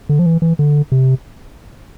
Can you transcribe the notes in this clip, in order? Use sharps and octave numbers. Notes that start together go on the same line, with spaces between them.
D3
F3
E3
E3
D3
C3